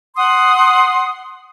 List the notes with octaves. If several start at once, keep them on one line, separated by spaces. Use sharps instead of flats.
F#5 C6 D#6